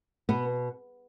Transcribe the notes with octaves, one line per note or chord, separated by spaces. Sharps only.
B2 B3